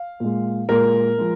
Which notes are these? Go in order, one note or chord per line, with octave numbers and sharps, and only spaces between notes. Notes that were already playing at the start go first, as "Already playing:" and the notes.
Already playing: F5
A#2 G#3
A#2 G#3 A#4
F3 G#3